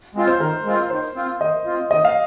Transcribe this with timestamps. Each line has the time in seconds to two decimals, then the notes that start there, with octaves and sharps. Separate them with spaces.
0.15 G#3 C4 F4
0.27 C5
0.40 D#3 A#4
0.65 G#3 C4 F4
0.90 D#3 C5
1.15 C4 F4
1.41 D#3 D#5
1.66 C4 F4
1.91 D#3 D#5
2.05 F5